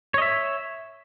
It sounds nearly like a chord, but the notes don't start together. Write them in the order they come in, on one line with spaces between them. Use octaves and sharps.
C#5 D#5 E5